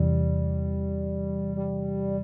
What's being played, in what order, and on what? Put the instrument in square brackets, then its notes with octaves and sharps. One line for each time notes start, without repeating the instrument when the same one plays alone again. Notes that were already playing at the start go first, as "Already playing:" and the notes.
Already playing: [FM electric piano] E2 C3 E3 [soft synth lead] G3
[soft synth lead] G3